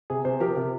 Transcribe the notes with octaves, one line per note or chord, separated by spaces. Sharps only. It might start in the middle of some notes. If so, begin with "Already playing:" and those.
C3 G#4
C3 G#4 C5
F3 G4 A#4
C3 G4